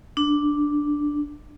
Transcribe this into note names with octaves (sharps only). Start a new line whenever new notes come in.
D4